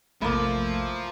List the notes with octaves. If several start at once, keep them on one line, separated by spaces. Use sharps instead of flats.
A#1 E2 C3 F3 A3 A#3 E4